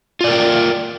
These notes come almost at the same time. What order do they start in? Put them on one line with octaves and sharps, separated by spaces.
F4 D5 A#4 G5